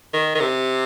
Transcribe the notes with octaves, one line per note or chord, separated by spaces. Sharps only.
D#3
D#3
C3